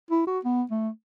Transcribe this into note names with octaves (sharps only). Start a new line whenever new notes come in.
E4
F#4
B3
A3